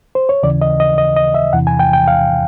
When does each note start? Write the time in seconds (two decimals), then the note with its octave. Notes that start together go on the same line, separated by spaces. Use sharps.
0.15 C5
0.29 C#5
0.43 D#2 C#3 E3 D5
0.61 D#5
0.80 D#5
0.98 D#5
1.17 D#5
1.34 E5
1.53 E2 C3 E3 F#5
1.67 G#5
1.79 G5
1.93 G5
2.08 F5